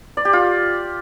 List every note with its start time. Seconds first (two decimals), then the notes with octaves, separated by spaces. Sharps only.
0.17 D5
0.25 G4
0.33 F4